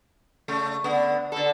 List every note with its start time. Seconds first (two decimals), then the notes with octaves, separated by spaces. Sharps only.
0.48 C#3 A3
0.84 D3 B3
1.32 D3 A4